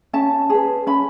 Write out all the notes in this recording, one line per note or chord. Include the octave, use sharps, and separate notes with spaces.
C#4 A5
G#4 B4
C#4 B5